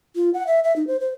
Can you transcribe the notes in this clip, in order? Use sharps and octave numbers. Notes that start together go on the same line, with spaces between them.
F4
F#5
E5
E5
D#4
C5
C5